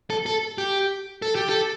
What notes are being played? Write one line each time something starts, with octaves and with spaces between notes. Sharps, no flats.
A4
A4
G4
A4
G4
A4